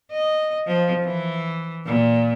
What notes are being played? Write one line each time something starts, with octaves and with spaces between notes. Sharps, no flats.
D#5
F3
E3
A#2